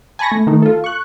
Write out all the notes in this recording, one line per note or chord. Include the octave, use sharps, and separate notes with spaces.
G#5 A5 B5 C#6 A#6
A3
D#3 A3 D#4
F4 A4
C#6 F#6